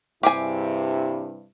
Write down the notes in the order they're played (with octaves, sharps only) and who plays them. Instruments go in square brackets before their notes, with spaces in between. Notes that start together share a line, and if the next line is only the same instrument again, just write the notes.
[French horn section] G2 C3 E4 [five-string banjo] G4 G#4 G#5